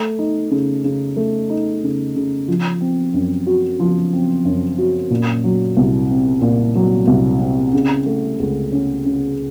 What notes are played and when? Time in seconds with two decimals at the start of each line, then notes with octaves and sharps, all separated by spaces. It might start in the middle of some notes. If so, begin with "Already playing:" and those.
Already playing: A3
0.19 D#4
0.51 C#3
0.84 C#3
1.16 A3
1.50 D#4
1.83 C#3
2.15 C#3
2.48 F3
2.80 C4
3.14 F#2
3.47 F#4
3.80 F3
4.13 C4
4.45 F#2
4.78 F#4
5.10 A#2
5.44 F#3
5.77 C2
6.10 C4
6.41 A#2
6.75 F#3
7.07 C2
7.40 C4
7.73 C#3
8.06 A3
8.40 C#2
8.72 C#4
9.05 C#3